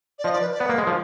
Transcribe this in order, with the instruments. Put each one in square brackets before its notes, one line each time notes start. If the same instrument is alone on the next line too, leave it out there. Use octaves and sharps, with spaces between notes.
[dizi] D5
[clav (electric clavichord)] F3 [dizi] D#5
[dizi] D5
B4
D5
[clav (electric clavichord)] B3 [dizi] B4
[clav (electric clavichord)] A#3
G#3
F3